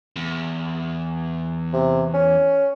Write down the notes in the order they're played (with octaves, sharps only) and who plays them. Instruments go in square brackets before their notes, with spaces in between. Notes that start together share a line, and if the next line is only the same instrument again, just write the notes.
[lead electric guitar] E2
[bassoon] C3
C#4